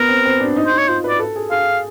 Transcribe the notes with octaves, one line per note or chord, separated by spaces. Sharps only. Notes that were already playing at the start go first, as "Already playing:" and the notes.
Already playing: B3 A#4
C4
C4
D4
D#4
C5
D#4
C#5
F4 C5
B4 D5
A4
G#4
G#4 F5